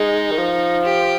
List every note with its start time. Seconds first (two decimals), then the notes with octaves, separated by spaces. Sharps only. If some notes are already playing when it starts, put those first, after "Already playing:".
Already playing: G#3 D#4
0.31 D#3
0.38 F3
0.85 G4